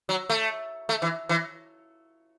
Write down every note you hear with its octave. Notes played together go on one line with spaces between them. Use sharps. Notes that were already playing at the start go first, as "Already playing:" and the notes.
F#3
A3
A3
E3
E3